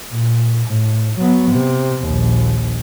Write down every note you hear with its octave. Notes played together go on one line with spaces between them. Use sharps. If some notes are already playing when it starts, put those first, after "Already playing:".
A#2
A2
F#3 B3
C3
A#1 D#2